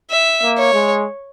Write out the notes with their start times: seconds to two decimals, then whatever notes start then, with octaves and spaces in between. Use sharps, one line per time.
0.11 E5
0.42 A#3
0.58 C#5
0.73 G#3